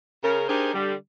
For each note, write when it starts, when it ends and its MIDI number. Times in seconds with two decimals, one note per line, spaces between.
0.22 0.45 49
0.22 0.45 70
0.48 0.73 62
0.48 0.73 63
0.48 0.73 67
0.48 0.73 68
0.48 0.73 70
0.48 0.73 72
0.73 0.93 50
0.73 0.93 55